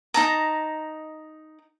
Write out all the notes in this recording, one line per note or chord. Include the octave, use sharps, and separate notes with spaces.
D#4 A5 A#5